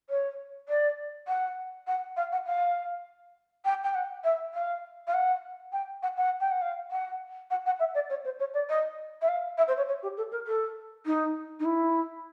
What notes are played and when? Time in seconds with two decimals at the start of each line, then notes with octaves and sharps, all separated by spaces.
0.10 C#5
0.69 D5
1.28 F#5
1.87 F#5
2.17 F5
2.32 F#5
2.47 F5
3.65 G5
3.84 G5
3.95 F#5
4.24 E5
4.54 F5
5.07 F5
5.14 F#5
5.73 G5
6.03 F#5
6.17 F#5
6.40 G5
6.51 F#5
6.62 F5
6.91 F#5
7.50 F#5
7.66 F#5
7.79 E5
7.95 D5
8.10 C#5
8.25 C5
8.39 C#5
8.54 D5
8.69 D#5
9.22 E5
9.29 F5
9.58 E5
9.68 C5
9.77 C#5
9.88 C#5
10.03 G4
10.17 A4
10.32 A#4
10.47 A4
11.06 D#4
11.60 D#4
11.65 E4